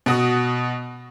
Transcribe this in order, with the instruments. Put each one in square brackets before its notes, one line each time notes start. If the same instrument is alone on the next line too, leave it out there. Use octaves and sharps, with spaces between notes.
[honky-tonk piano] B2 F#4 D#6